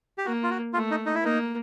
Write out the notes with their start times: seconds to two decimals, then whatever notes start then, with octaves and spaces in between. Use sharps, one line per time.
0.18 G4
0.25 A#3 F#4
0.43 F4
0.51 F#4
0.73 A3 F4
0.91 D#4
1.06 D#4
1.15 E4
1.22 A#3 D#4